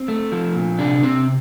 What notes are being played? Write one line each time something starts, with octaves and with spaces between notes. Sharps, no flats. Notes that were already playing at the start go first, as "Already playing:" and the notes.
Already playing: C4
A3
F3
A#2
C3 D4
C3 C4